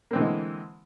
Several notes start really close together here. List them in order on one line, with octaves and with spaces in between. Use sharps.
A#3 C4 E3 D3 G#3